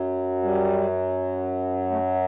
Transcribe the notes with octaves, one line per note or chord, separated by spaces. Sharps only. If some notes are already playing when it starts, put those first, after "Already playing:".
Already playing: F#2 F#3
G3
A3